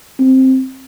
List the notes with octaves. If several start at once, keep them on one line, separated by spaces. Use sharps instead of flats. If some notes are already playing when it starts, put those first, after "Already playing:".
C4